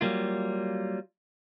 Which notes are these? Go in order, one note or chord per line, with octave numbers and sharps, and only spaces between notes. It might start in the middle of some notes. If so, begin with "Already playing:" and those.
F#3 G3 A#3 F4